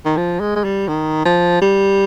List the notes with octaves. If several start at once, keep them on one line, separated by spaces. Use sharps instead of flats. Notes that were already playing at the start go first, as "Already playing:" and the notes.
D#3
F3
G#3
G#3
G3
D#3
F3
G3